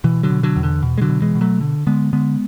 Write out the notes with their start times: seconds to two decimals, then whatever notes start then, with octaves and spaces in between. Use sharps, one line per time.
0.04 B2 E3
0.23 D3 F#3
0.30 B2
0.43 D3 F#3
0.56 E2
0.63 D3
0.83 B2
0.98 G#3
1.01 D3 F#3
1.09 B2
1.22 E3 G#3
1.35 B2
1.41 F#3 A3
1.61 D3
1.87 D3 G#3 B3
2.13 D3 G#3 B3